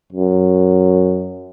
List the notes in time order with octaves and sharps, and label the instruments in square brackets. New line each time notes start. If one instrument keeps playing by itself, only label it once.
[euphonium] F#2